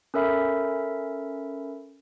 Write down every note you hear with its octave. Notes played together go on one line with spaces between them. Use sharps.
C#4 A4 A#4 E5 B5